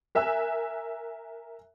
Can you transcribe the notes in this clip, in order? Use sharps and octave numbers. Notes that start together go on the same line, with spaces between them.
A#4 E5 G#5 E6 F#6